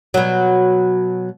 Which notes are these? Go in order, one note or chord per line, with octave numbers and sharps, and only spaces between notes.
B2 F#3